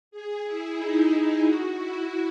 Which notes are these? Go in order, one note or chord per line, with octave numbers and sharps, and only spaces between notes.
G#4
E4
D#4
E4
F#4
E4